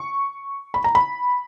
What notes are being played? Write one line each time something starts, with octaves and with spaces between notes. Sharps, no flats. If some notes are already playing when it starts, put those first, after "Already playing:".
Already playing: C#6
B5
A#5
B5